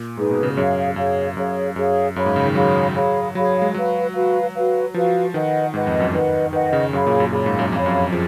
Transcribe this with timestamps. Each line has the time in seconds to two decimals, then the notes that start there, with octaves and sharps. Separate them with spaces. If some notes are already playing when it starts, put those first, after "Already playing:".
Already playing: A#2
0.17 G#2 D#4 G#4 B4
0.31 B2
0.43 C#3
0.56 F#2 G#4 C#5 F5
0.96 F#2 G#4 C#5 F5
1.37 F#2 G#4 C#5 F5
1.76 F#2 G#4 C#5 F5
2.15 F#2 G#4 C#5 F5 B5
2.26 G#2
2.36 C#3
2.46 D#3
2.55 F#3 G#4 C#5 F5 B5
2.96 G#4 C#5 F5 B5
3.35 F#3 G#4 C#5 F5 B5
3.62 G#3
3.74 F#3 F#4 B4 F5
4.15 F#4 B4 F5
4.55 F#4 B4 F5
4.94 F3 F#4 B4 F5
5.33 D#3 B4 D#5 F#5
5.74 G#2 B4 D#5 F#5
5.87 F2
6.00 F#2
6.13 D#3 B4 D#5 F#5
6.53 D#3 B4 D#5 F#5
6.73 C#3
6.93 F#2 G#4 C#5 F5 B5
7.07 A#2
7.20 F#2
7.32 A#2 G#4 C#5 F5 B5
7.46 G#2
7.59 F#2
7.72 F2 G#4 C#5 F5 B5
7.86 F#2
8.12 F3 G#4